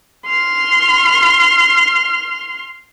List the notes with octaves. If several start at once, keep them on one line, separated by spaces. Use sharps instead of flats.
C6 F6